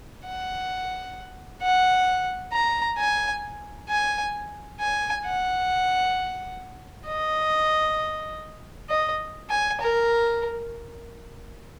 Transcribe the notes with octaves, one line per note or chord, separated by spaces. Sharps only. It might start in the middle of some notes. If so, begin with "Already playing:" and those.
F#5
F#5
A#5
G#5
G#5
G#5
F#5
D#5
D#5
G#5
A#4